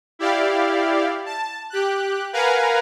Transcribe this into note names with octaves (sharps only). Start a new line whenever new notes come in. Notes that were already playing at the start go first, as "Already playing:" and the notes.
E4 G4 D5 F5
A5
G4 F#6
A#4 B4 F5 F#5 G#5 A#5